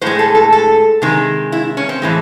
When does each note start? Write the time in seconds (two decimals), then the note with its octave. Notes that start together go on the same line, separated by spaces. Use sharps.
0.02 A2 G#3 C5
0.19 A4
0.35 A4
0.52 A4
1.02 C3 D#3 G#3
1.52 E4
1.77 C#4
1.89 C4
2.02 A2 E3 G#3